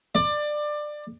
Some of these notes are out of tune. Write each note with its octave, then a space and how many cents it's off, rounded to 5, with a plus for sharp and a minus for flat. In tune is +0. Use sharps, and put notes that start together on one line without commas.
D5 +20